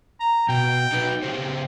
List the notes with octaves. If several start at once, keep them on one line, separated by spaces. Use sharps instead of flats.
A#5
B2 G5
D#4 F#4 B4
C#3 G4 C5